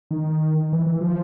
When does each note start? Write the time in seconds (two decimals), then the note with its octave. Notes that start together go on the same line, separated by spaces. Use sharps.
0.11 D#3
0.73 E3
0.87 E3
1.01 F3